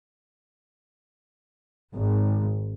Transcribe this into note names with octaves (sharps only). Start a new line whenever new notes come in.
G#1